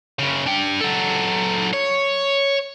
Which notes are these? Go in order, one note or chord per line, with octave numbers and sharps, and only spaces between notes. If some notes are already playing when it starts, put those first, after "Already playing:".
F#2 C#3
D4 G5
F#3 A4
C#5